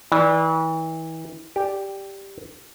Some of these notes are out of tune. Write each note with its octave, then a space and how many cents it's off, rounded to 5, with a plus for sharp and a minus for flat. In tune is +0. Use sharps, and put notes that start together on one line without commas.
E3 -35 D5 +0
G4 +0 D5 -5